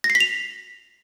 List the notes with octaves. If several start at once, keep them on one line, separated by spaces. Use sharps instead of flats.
A#6
C7
B6
F7